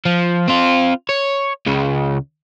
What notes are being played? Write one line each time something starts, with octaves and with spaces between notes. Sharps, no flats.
F3
C4 F4
C#5
C#2 C#3